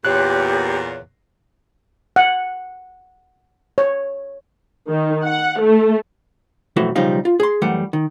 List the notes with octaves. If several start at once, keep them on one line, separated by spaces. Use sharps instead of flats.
E2 A#2 G4 C#5 F#6
F#5
C#5
D#3
F#5
A3
B1 F2 A2 E3 A3 F#4
B1 C#3 F3 G3 D#4 F5
F4
G#4 C6
F#2 E3 G3 A3 F#5
D#3